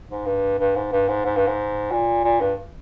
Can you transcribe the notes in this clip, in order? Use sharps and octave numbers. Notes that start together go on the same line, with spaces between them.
G#2
G2
G2
G#2
G2
G#2
G#2
G2
G#2
A#2
A#2
G2